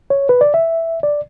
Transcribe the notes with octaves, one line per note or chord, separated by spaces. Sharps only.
C#5
B4
D5
E5
D5